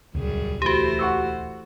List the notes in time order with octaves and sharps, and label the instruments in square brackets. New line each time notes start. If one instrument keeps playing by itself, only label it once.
[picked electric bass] D#1 C#2 [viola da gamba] F#2 G3 G#4
[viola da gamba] E3 A3 C5 [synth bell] F#4 G4
[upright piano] F#5 C#6 E6